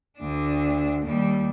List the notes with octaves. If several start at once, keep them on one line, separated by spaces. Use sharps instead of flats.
D2 D4
D#2 G3